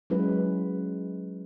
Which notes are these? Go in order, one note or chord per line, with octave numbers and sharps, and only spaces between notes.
F#3 G#3 C#4 E4 B4